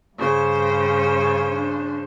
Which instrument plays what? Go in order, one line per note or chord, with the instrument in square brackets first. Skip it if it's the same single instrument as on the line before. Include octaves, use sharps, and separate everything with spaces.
[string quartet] G2 C#3 C5
[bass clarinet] D4